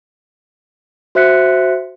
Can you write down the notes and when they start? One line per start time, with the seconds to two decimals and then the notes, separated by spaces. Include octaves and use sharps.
1.15 F#4 C5 E5 F#6 B6 C#7